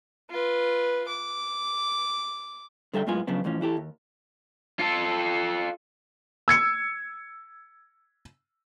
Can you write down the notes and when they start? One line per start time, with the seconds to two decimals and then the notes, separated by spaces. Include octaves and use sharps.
0.30 F4 B4
1.08 D6
2.94 D3 G3 A4 E5 G5
3.07 F#2 A2 G#3 B3 F4 G#5
3.27 C#3 F3 F#3 B3 D4
3.44 F2 A2 E3 F3 C#4
3.61 E3 E4 G4 A4
3.77 D#2
4.79 F4 A4
6.48 E6 G#6 C#7